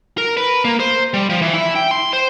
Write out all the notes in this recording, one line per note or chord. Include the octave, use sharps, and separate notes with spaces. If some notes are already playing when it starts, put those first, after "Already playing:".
A#4
B4
A#3
C5
G3
F3
E3
E4
G5
C6
C5